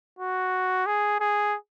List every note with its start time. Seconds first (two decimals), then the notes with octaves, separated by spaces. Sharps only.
0.19 F#4
0.86 G#4
1.20 G#4